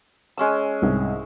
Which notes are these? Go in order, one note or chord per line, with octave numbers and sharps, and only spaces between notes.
G#3 C#4 E6
C2 G#2 D#5